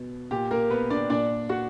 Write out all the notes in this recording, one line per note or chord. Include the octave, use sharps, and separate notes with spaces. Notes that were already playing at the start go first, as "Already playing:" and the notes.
Already playing: B2
A#2 G4
A#3 A#4
B3 B4
D4 D5
A#2 D4 D5
F#4 F#5